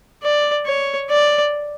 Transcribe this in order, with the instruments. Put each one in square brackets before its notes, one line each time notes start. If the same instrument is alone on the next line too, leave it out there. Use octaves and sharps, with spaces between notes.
[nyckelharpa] D5
C#5
D5